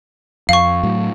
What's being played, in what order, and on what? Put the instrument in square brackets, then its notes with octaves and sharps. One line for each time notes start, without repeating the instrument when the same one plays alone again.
[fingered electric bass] F2 [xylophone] F5 C#6
[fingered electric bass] A2 F#3